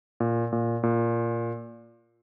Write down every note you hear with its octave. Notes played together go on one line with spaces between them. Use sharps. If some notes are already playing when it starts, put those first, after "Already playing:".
A#2
A#2
A#2